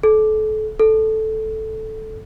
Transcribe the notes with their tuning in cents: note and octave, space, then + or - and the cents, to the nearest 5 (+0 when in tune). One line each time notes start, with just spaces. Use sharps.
A4 -30
A4 -5